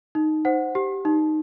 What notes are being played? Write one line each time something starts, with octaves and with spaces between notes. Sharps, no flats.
D#4
C5 F#5
G4
D#4